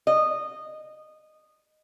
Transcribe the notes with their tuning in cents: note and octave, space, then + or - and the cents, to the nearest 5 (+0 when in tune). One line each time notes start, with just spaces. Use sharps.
D#5 -15